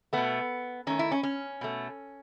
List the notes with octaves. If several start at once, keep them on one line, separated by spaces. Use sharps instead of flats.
B2 A3 B3
D#3 A3 C#4
E4
C#4
C#4
B2 A3